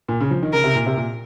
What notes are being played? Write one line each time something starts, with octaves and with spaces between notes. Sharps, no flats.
A#2
C#3
F3
D#3
C#3 A#4
C3
A#2
C3
A#2